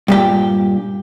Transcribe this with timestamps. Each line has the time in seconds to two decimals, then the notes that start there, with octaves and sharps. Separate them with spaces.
0.08 G2 A#2 G4